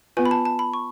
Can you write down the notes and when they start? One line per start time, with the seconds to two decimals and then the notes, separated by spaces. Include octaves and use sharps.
0.17 B3 F4 B4 G#5
0.26 B5
0.31 A5
0.45 A5
0.59 B5
0.74 C#6